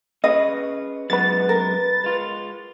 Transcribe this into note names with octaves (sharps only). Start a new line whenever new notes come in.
C#4 G#4 B4 D#5
F#2 G#3 B3 B4 A6
A#4
G#3 F4